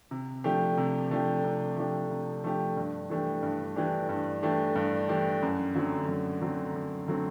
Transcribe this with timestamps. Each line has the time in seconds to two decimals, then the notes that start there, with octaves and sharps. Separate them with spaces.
0.11 C3
0.44 F3 A3 D4 G4
0.78 C3
1.11 F3 A3 D4 G4
1.44 C3
1.77 F3 A3 D4 G4
2.11 C3
2.44 F3 A3 D4 G4
2.77 G2
3.09 E3 A3 D4 G4
3.43 G2
3.76 E3 A3 D4 G4
4.09 G2
4.43 E3 A3 D4 G4
4.76 G2
5.08 E3 A3 D4 G4
5.42 F#2
5.75 D3 F#3 A3 C4
6.08 F#2
6.42 D3 F#3 A3 C4
6.75 F#2
7.08 D3 F#3 A3 C4